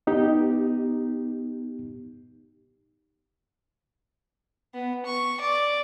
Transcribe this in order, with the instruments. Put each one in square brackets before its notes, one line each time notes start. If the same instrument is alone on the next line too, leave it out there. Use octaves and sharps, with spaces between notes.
[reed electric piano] B3 D#4 G4
[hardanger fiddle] B3
C#6
D5